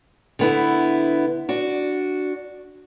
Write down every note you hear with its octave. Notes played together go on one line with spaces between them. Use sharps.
D3 B3 E4
D4 F#4